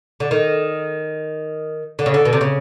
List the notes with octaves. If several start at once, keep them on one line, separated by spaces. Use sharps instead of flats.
D3
D#3
D3
C#3
D3
B2
C3
C#3